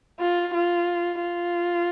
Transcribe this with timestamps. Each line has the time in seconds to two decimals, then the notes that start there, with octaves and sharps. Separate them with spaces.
0.20 F4
0.54 F4
1.22 F4